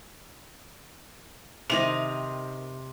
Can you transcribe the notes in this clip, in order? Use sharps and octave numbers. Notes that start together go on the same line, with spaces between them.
C3 D#3 C4 D#5 F7